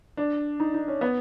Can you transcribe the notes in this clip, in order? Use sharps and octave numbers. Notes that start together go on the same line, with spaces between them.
D4
D#4
D#4
C#4
B3